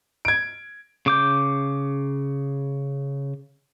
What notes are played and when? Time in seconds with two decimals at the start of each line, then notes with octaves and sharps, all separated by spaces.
0.25 G#6 D7
1.06 C#3 D6 G6